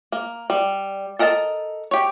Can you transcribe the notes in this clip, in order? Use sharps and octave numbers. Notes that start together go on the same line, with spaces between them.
A#3
G3
A4 A#4 D#5 F5 A5
G4 C#5